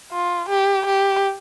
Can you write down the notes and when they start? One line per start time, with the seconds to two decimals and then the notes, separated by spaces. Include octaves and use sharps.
0.12 F4
0.49 G4
0.86 G4